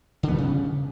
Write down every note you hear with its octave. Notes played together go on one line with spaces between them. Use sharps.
D3
B3
G3
C#3